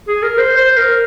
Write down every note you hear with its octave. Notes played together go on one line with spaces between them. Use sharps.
G#4
A#4
C5
C5
A#4